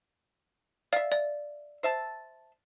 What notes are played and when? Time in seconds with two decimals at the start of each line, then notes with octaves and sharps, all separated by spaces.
0.93 D5 E5 F5
1.12 D5
1.83 C5 E5 A5